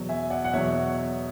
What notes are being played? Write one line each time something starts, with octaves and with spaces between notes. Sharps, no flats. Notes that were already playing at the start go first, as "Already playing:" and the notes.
Already playing: E2 B2 F#3
E5 G#5
D5 F#5
F#5
E2 B2 F#3 C#5 E5